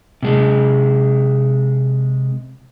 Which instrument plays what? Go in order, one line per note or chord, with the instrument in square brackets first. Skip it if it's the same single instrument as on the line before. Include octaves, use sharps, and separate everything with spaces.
[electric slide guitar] C3 G#3